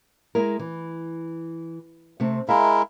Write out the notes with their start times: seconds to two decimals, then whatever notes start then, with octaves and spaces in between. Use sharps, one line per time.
0.35 G#3 E4 A#4
0.59 E3
2.20 C3 A3 C4
2.49 G#3 E4 A#4 E5 F5